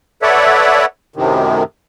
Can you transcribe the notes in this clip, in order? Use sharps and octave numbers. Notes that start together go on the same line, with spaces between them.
A4 B4 C#5 D5 E5 F#5
F#2 A2 C3 D#3